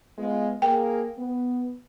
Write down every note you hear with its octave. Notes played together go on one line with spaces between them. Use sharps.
G#3 B3 F4
A#3 G#4 A#4 G5
B3